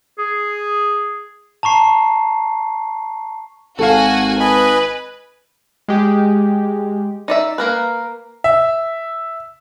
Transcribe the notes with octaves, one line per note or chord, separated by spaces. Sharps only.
G#4
A5 A#5 C#6 C7
G#1 F#4 A4 F5 G#5
B4 D#5 G#5 B5
G#3 G4
D#4 D5 E5
A#3 A#4 B4
E5